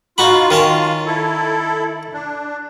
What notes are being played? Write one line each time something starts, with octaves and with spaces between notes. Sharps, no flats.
D#4 F4 F#4 B5
D#3 C#4 A5
E4 A4
D4